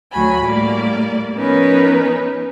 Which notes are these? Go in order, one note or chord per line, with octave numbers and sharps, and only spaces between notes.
D2 F#3 F#4 G#5 B5
A2 G3 A#3 D5
F3 B3 C#4 D#4 A#4 B4